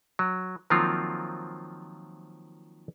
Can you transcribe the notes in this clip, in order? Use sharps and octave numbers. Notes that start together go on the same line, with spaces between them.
F#3
D#3 F3 F#3 A#3 C4 F4